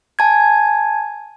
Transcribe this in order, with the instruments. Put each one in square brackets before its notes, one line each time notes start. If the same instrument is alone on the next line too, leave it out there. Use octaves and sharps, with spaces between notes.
[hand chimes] G#5 A5 G#6